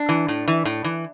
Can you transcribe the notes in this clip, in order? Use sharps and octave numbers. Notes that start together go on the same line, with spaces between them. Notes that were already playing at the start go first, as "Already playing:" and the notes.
Already playing: D4
E3
A2
E3
A2
E3